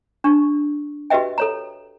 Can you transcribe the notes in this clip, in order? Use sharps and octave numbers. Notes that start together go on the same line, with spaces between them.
D4 C#6
F#4 G4 B4 D#5 E5 G5
A4 C#5 A#5